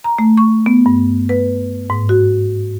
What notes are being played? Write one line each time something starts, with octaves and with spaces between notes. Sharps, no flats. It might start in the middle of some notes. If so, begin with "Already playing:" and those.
A#5
A3
C#6
B3
G2
B4
G#2
F#4